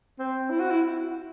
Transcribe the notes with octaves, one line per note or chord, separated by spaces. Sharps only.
C4
E4
F#4
E4